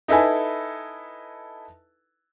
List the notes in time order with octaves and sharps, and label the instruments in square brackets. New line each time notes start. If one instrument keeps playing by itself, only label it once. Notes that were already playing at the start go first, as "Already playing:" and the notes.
[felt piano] D#4 E4 A4 B4 G#5